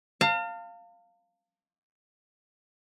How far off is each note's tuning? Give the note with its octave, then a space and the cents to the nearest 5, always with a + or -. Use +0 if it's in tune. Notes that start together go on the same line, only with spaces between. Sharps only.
F5 +0 A5 +45